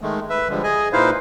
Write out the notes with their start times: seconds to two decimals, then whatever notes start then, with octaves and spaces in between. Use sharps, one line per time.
0.01 D#3 G#3 A3
0.30 B4 E5
0.50 D3 F3 G3 G#3
0.63 G#4 D#5 G#5
0.93 A#2 D#4 E4 B4 C5 F5